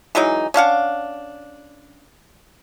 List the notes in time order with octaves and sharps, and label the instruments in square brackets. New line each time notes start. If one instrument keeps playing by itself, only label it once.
[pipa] E3 F#3 G#3 D#4
C#4 D4 F5 F#5